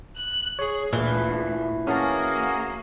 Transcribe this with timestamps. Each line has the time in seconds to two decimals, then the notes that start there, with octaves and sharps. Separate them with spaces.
0.16 F#6
0.59 G#4 C#5
0.93 D2 A#2 E3
1.87 A#3 C#4 F#4 G#4 A#4 A5